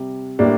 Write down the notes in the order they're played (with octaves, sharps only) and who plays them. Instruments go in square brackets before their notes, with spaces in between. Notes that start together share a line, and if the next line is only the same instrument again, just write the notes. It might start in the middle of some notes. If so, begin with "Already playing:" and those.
Already playing: [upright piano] C3 G3
A2 G3 A#3 D4